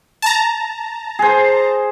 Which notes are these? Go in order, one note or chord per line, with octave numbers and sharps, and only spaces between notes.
A5 A#5
G#4 C5